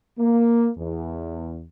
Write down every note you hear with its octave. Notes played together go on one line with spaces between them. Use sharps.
A#3
E2